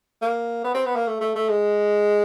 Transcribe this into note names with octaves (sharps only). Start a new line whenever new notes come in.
A#3
B3
C4
B3
A#3
A3
A3
A3
G#3